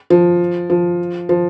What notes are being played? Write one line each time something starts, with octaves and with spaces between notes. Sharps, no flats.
F3
F3
F3